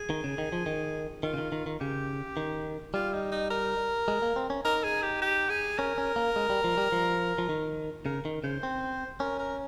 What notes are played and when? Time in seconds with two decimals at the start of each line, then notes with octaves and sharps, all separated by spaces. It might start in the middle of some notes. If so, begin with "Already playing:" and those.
Already playing: G#4
0.10 D#3
0.24 C#3
0.38 D#3
0.52 F3
0.66 D#3
1.23 D#3 F4
1.34 C#3
1.38 D#3
1.52 D#3
1.66 D#3
1.81 C#3 G4
2.37 D#3
2.94 G3 F4
3.13 D#4
3.32 D#4
3.51 A#4
4.08 G#3
4.22 A#3
4.36 C4
4.50 C#4
4.65 D#4 A#4
4.84 G#4
5.02 G4
5.22 G4
5.50 G#4
5.78 C#4 A#4
5.98 C#4
6.16 A#3
6.36 G#3
6.50 G3
6.64 F3
6.77 G3
6.92 F3
7.38 F3
7.49 D#3
8.05 C#3 A#4
8.25 D#3
8.44 C#3 C5
8.63 C4
9.20 C#4 A#4
9.39 A#4